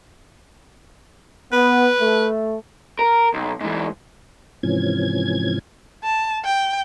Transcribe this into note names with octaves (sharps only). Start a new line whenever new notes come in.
B3 B4
A3
A#4
B1
G#2 E3
G#2 C3 E3 F3 C#4 G#6
A5
G5